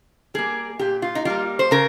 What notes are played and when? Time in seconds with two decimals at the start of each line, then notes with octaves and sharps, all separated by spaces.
0.34 G3 A#3 G#4
0.79 A#2 G4
1.02 F4
1.15 D#4
1.25 G3 A#3 F4
1.59 C5
1.71 C#3 A#4